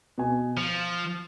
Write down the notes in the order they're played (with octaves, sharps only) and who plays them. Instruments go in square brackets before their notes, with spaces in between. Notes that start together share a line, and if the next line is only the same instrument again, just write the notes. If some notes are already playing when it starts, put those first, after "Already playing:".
[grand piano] B2 G#5
[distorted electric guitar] F3 [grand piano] C#7